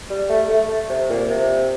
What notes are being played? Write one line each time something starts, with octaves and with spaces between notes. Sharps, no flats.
G3
A3
A3
C3
A#2
C3